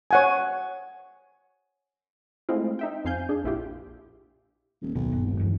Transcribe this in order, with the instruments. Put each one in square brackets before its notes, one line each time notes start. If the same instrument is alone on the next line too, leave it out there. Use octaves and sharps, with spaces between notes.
[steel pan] C#5 F#5 G#5
[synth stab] G#3 A3 C4 E4 F4
D#4 E5 G5
F2 C4 F5 G#5 G6
D4 G#4
A#1 E4 F4 G4
[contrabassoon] D#1
[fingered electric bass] D1 B2 D#3 [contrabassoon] B1
[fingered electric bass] D#1 G2
[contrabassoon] G#1
[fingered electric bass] G2 E3 F#3